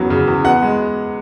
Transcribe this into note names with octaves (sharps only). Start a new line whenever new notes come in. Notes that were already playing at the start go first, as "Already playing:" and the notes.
Already playing: E2 C#3 F#3 B3
C#3
E2
B3 F#5
G#3